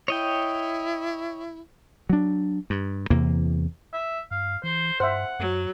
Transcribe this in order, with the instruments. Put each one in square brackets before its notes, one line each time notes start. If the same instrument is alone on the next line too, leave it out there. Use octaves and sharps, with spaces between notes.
[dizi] E4 [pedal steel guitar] C#5 D#5 G5
[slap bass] F#3 D4
G2
E2 C3 E3 A#3
[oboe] E5
[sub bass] G2 [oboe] F5
[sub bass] E3 [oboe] C5
[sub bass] G2 [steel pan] C5 E5 [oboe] F#5
[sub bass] F#2 [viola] F#3